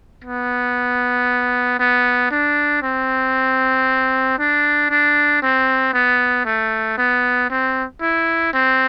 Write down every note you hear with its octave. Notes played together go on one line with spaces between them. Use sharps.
B3
B3
D4
C4
D4
D4
C4
B3
A3
B3
C4
E4
C4